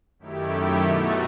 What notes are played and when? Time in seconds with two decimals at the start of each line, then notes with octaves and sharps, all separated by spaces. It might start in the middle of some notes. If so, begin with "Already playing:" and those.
0.19 F#2 D#3 A3 E4 G4
0.81 B2 A3 D#4 F#4